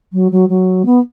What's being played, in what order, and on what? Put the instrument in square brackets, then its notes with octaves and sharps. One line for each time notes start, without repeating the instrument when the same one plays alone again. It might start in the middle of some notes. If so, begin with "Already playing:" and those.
[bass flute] F#3
F#3
F#3
B3